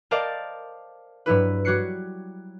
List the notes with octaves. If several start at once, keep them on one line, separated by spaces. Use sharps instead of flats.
A#4 C5 D5 D#5 F5 A5
G2 F#3 E4 B4
G3 F#4 C#5 F#6 C7 C#7